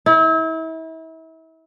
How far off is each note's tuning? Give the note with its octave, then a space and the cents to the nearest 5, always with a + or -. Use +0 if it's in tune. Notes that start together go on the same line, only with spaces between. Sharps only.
E4 -35